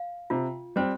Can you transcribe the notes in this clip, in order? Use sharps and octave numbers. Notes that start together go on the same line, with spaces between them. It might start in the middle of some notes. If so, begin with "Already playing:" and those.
Already playing: F5
C3 F4
G3 C4 C5